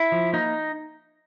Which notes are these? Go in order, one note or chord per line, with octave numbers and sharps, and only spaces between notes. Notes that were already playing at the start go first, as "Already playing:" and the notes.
Already playing: E4
F3
A#3 D#4